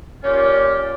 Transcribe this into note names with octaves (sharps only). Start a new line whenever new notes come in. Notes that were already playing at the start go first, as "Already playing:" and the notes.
A#2 C#4 F4 G4